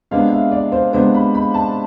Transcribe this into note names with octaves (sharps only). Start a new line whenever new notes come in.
C3 G#3 B3 D4 F5
E5
D5
C5
C3 G#3 B3 D4 C5
B5
B5
A5